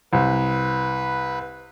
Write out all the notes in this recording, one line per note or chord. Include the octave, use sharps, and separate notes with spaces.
C2 B4